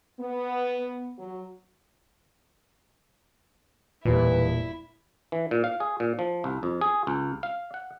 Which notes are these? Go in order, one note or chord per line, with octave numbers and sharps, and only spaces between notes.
B3
F#3
E1 A#2 G3 E4 B4
E3
A#2
F5
G#4
A#2
F3
C2
F2
G#4
C#2
F5
F#5